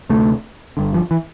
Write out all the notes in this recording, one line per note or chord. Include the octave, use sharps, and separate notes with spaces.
D2 C3 A3
G1 G2 D3
F3
E3